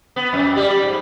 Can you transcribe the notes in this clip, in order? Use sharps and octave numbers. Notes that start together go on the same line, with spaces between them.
B3
F2
G3 G4
G#2